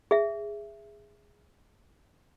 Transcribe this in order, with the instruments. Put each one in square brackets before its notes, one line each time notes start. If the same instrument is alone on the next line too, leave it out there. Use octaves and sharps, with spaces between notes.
[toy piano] G#4 E5